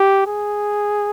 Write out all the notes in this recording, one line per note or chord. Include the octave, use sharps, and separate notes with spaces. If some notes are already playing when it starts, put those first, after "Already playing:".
Already playing: G4
G#4